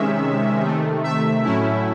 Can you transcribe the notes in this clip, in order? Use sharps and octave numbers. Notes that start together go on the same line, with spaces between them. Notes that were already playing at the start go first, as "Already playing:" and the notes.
Already playing: C3 D#3 G#3 C#4 E5
C3 D#3 A3
E5
A2 F#3 A3 C#4 E4